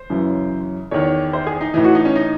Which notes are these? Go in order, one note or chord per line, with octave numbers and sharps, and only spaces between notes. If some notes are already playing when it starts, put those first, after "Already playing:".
Already playing: C5
F#2 C#3 E3
E2 D#3 C#5
C5
G#4
D#4
A2 E3 D#4
F#4
D#4
C#4
D#4